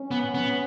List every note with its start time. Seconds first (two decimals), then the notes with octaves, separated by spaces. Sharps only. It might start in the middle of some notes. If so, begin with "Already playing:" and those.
Already playing: C#4
0.11 B3
0.35 B3